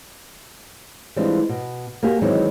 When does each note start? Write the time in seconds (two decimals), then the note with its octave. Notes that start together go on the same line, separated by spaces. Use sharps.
1.16 E3 F3 G3 G#3 C4 D4
1.49 B2
2.03 A#3 F#4 G4 G#5
2.22 D#3 E3 F#3 G#3 C4 D#4